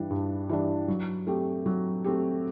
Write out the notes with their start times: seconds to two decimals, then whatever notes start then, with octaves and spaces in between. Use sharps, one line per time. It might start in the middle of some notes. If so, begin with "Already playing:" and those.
Already playing: G2 E3 G3 D4
0.10 G2
0.49 E3 G3 D4
0.88 F#3
1.27 A3 C4 G4
1.66 F#3
2.04 A3 C4 G4